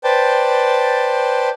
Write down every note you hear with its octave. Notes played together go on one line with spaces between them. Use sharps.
B4 C5 D5 G5 A5